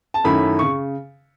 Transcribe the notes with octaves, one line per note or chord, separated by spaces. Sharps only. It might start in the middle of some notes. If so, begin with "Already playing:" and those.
A5
F#2 D#3 A3 C#4 E4 B5
C#3 C#6